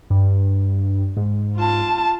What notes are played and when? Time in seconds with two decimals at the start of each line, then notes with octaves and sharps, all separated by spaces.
0.10 G2
1.17 G#2
1.57 F4 A5